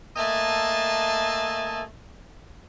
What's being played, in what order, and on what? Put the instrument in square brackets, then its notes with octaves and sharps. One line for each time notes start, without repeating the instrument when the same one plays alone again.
[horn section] A3 A#3 D#5 E5 G#5 A5